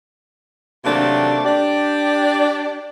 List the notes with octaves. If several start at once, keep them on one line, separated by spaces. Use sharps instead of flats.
C3 D#3 F#3 A3 A#3 D4
D4 G4 D5